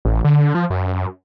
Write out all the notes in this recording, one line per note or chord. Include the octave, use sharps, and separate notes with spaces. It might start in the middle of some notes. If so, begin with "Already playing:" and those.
A1
D3
F3
F#2